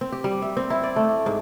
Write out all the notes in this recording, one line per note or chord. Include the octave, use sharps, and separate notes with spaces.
C4
G4
G3
E5
C4
E4
D5
A3
G#2